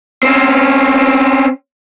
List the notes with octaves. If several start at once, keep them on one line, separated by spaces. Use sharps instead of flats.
C4 C#4